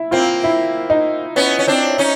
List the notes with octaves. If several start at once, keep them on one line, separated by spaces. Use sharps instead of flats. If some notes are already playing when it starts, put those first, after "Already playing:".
Already playing: E4
A#3 C4 F4
E4
D#4
B3 C#4
C#4
C4 D4
C#4 D#4